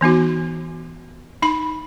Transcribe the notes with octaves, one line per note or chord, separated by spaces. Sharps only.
E3 B3 D#4 F#4
D#4 B5